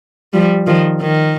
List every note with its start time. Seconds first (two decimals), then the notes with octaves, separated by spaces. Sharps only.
0.33 F3 G3
0.67 D#3 F3
1.01 D#3